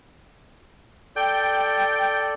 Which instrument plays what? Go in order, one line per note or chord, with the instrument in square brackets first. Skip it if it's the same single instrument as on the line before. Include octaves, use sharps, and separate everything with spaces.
[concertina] A4 D5 [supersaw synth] G5